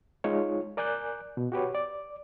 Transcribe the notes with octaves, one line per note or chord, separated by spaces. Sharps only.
G#3 D#4 F4 C#5
A#4 D5 G#5 F#6 G6
B2
F#4 G4 B4 C#5
D5